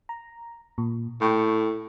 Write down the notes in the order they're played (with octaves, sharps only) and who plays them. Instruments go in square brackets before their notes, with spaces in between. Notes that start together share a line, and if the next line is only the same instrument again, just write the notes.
[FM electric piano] A#5
A#2
[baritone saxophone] A2 [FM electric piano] G5 C#6